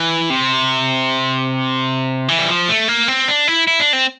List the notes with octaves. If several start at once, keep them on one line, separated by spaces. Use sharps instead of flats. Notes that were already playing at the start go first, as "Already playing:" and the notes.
Already playing: E3
C3
E3
G3
F3
A3
A#3
C4
D4
E4
E4
D4
C4